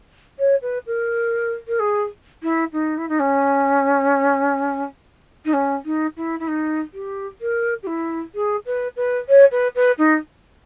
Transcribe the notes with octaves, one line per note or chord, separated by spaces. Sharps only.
C#5
B4
A#4
A#4
G#4
E4
D#4
E4
D#4
C#4
D#4
C#4
D#4
E4
E4
D#4
G4
A#4
G4
E4
G#4
B4
B4
C#5
B4
B4
D#4